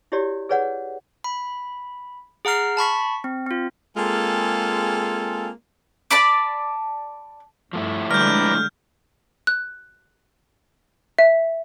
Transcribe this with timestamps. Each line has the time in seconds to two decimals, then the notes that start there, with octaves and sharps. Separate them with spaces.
0.12 E4 F#4 G4 C#5 D5
0.49 G#4 B4 C#5 D5 F#5
1.24 B5
2.45 G#4 F#5 A#5 F6 C7
2.77 A5 B5 C#6 B6
3.24 C4
3.47 C4 F4
3.96 G#3 A#3 C4 F4 G#4 A4
6.11 D5 A5 B5 D6
7.73 G2 F3 A3 E4
8.11 D3 G3 G#3 B4 D5 A#5 F6 G6
9.47 F#6
11.18 E5